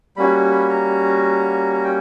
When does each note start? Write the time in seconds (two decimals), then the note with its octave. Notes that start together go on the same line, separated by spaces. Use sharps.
0.17 G3 A#3 C#4 F#4 B5
0.51 B5
0.70 A#5
1.74 A#5
1.84 G5